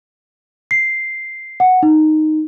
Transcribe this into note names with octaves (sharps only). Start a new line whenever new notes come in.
C7
F#5
D#4